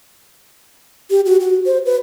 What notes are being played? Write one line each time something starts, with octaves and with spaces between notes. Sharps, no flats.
G4
F#4
F#4
C5
B4